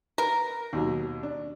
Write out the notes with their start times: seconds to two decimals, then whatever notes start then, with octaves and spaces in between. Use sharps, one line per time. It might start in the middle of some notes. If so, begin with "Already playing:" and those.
0.18 A#4 B4
0.73 D#2 B2 F#3
1.23 D4